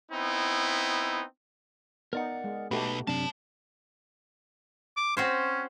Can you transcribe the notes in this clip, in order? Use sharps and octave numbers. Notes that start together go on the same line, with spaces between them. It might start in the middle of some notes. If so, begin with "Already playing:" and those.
B3 C4 D#4 E4
B3 D#4 A#4 D5 F#5
G#3
B2 A3 D#4 F#4 G4 B4
F#2 C3 D4 C#5 A5
D6
C4 C#4 F#4 C5